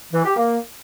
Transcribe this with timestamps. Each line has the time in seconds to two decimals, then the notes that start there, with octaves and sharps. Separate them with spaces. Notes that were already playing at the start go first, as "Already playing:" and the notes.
0.13 E3
0.25 G4
0.37 A#3